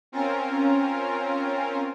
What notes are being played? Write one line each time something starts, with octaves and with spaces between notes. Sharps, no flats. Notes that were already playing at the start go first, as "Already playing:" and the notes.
C4 C#4 F4 A#4